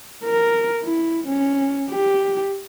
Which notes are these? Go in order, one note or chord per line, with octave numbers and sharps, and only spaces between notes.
A#4
E4
C#4
G4